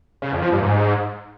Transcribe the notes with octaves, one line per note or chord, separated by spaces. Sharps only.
C#3
F2
F3
G2
G#2